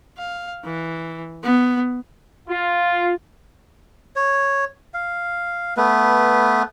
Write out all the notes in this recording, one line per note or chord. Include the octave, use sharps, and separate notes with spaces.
F5
E3
B3
F4
C#5
F5
A3 B3 B4